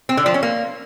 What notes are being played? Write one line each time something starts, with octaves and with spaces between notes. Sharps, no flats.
C4
D3
F3
C#4
A#3